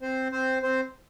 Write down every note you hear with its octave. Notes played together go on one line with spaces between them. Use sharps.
C4 C5
C4 C5
C4 C5